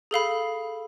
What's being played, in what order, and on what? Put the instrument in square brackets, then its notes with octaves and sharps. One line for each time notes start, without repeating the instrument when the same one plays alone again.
[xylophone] G#4 A4 F5 B5